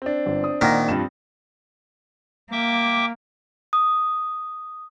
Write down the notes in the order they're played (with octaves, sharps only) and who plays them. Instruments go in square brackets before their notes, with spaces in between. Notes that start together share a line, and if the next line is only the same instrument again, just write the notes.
[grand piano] C4 D4
[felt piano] G1
D#6
[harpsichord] A#2 D#3 [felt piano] F#5 A#5 A#6
[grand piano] G2 F3 G3 [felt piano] C4 E7
[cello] A#3 [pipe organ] E5 G5 D6
[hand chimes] D#6